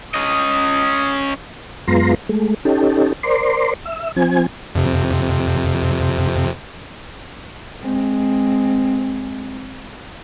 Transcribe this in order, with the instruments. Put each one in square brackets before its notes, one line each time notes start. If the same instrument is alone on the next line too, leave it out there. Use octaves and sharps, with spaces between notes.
[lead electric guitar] C#4 D#5 [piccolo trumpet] D#6
[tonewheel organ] F#2 G#3 B3 F4 A#5 C6
G#3 A3
C#4 D#4 G4 A4
A#4 C5 D5 C6
E5
F3 C4 G#5
[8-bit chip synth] F2 C3
[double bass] G#3 C4